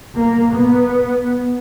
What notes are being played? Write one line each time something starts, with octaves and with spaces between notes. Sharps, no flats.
A#3
B3